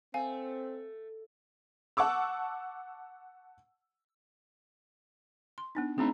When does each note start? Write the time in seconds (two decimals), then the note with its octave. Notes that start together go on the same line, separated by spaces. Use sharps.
0.14 A3 C4 F5 G#5
1.97 F#5 A5 C#6 D6 E6
5.58 C6
5.75 B3 D4 D#4
5.98 A3 C4 D4 D#4 G#4 A#5